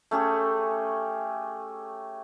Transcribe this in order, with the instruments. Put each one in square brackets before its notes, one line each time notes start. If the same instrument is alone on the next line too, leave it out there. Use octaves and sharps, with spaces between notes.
[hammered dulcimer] A3 C#4 G4 G#4